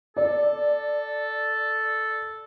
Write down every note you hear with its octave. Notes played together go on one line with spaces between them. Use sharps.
A4 D5